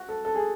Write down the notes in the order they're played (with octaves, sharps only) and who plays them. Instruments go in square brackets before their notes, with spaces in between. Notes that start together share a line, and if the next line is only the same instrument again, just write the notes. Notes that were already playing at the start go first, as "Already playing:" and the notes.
Already playing: [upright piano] F#4
A4
A4
G#4